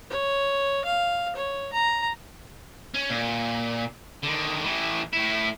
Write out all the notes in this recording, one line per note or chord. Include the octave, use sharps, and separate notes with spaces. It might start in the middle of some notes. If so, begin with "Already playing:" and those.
C#5
F5
C#5
A#5
C#4
A#2
D3 D#3
A2 E3
A2 E4